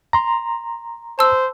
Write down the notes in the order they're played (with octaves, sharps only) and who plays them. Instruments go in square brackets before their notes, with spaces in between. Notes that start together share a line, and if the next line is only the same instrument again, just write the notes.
[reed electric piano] A#5 C6
[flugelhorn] C5 [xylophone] A5 E6